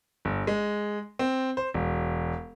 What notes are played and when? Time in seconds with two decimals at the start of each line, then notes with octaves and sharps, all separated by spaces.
0.25 G1
0.47 G#3
1.19 C4
1.57 C5
1.74 E1